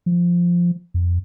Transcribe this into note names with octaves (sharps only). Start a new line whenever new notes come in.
F3
F2